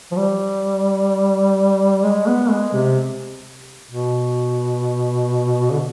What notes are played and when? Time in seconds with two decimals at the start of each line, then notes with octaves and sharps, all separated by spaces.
0.11 F3
0.17 G3
2.04 G#3
2.27 B3
2.50 G#3
2.74 C3
3.91 B2
5.71 D3